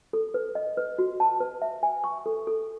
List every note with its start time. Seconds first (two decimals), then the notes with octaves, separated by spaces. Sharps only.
0.13 A4
0.34 B4
0.55 D#5
0.77 B4
0.99 F#4
1.20 A5
1.40 B4
1.62 E5
1.83 G#5
2.04 C#6
2.26 A4
2.47 A4